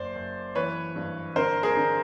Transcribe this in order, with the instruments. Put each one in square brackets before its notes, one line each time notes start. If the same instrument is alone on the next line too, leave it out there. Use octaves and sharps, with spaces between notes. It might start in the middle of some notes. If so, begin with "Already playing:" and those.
Already playing: [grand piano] F#1 C5 D5
F#1
E3 B4 C#5
G2
D3 A#4 C5
G#4 A#4
D3